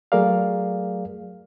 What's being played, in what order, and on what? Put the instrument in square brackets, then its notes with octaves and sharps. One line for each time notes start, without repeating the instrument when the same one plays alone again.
[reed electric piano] F#3 A3 G#4 A#4 D5 F5